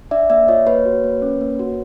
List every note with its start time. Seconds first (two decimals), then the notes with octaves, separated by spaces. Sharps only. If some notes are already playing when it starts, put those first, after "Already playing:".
0.11 D4 D5 E5
0.30 A#3 D5 E5
0.48 F4 C#5 D#5
0.67 A#3 B4 C#5
0.86 F#4
1.04 A#3
1.22 C#4
1.41 A#3
1.59 F#4